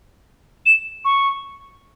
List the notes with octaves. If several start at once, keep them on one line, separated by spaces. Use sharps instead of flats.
E7
C#6